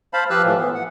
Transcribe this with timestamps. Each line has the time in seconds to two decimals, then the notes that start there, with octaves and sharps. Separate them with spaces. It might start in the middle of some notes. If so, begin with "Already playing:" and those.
0.13 C5 F5 A5 B5
0.30 F3 G4 B4 F5 E6 F#6
0.44 A2 E3 F3
0.58 B3
0.75 F#5